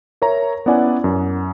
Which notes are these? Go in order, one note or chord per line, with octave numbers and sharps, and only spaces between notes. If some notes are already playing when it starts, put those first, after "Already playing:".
A#4 C#5 E5 A#5
B3 C#4 E4 D5 F#5 G#5
F#2